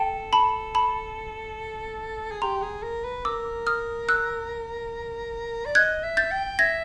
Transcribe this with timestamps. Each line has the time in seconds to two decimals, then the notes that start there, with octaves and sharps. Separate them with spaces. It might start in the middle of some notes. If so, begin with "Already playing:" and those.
Already playing: A4 G5 A5
0.33 A5 B5
0.75 A5 B5
2.31 G#4
2.42 G4 A#5 C6
2.62 G#4
2.83 A#4
3.04 B4
3.25 A#4 D6 E6
3.67 D#6 F6
4.09 E6 F#6
5.65 D5
5.75 D#5 F#6 G#6
6.03 E5
6.17 G6 A6
6.31 G5
6.59 E5 G#6 A#6